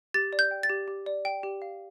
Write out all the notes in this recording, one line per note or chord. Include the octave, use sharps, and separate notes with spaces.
G4 A6
D5
G6
G5
A6
G4
G4
D5
G5
G4
F5